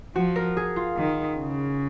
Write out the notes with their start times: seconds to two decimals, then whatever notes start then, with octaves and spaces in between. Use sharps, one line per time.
0.15 F3 F#4
0.36 A#4
0.57 G#4
0.76 F4
0.96 D#3
1.37 C#3